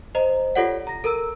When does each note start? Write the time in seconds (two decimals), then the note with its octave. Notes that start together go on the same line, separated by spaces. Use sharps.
0.15 C5 D#5 A#5
0.56 F4 G4 A4 C#5 D5 F#5
0.87 A#5 A#6
1.04 A4 A#4 A#5 E6